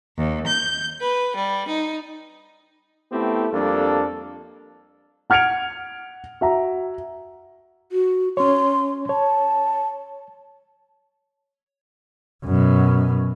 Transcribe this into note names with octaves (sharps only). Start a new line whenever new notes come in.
D#2
G6
B4
G3
D#4
A3 B3 C4 E4 G4
F2 G3 A#3 D4 A4
F#5 F6 G#6 C#7 D7 F7
F#4 E5 A#5
F#4
C#4 C#5 C6
C#5 A5
F#2 B2